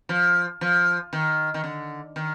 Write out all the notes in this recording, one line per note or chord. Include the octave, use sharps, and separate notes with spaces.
F3
F3
D#3
D#3
D3
D#3